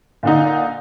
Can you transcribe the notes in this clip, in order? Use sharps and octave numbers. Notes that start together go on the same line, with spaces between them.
A#2 D3 D#4